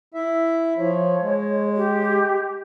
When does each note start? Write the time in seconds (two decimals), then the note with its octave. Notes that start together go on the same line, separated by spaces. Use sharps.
0.14 E4 E5
0.77 F3 C#5
1.22 G#3
1.76 G4